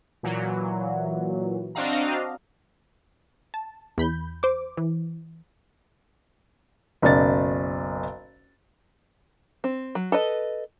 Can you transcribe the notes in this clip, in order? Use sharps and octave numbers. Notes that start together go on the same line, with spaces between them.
A#2 E3 F#3
C4 D4 F#4 D#5 F5 A#5
A5
E2 B5 G6
C5 D6
E3
F#1 B1 D5 A6
C4
F#3
A4 B4 D#5